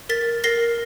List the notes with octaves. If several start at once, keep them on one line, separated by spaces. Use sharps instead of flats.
A#4 A6 B6
A#4 A#6 C7